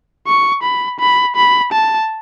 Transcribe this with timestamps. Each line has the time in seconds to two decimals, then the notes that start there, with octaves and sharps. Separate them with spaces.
0.27 C#6
0.63 B5
1.00 B5
1.36 B5
1.72 A5